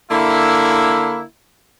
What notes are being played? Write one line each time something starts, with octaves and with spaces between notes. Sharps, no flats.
D3 A#3 E4